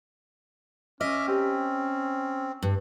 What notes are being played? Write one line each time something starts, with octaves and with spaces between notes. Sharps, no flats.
C#4 D#5 E5 D6 F6
C4 G4 A#4
G2